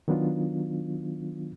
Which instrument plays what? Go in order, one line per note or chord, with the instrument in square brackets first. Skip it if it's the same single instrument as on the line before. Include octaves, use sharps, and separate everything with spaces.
[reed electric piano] D#3 F#3 B3 D4 F4